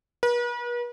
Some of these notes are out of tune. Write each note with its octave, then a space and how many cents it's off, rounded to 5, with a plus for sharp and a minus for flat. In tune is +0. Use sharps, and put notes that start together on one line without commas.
B4 -40